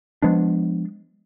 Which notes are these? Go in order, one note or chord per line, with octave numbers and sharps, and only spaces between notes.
F3 G#3 B3 D4